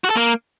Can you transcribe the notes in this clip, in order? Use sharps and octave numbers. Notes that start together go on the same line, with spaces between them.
F#4
A4
A#3